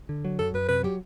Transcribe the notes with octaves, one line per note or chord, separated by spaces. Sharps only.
D3
F#3
F#2 A4
F#2 B4
C3 B4
F#3 G4